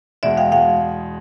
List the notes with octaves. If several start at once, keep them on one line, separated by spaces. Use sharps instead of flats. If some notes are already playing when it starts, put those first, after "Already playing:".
E2 B2 G#3 D5 E5
F5 G5
B2 G#3 F5 G5